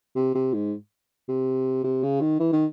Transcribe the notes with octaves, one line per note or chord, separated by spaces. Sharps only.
C3
C3
G#2
C3
C3
C#3
D#3
E3
D#3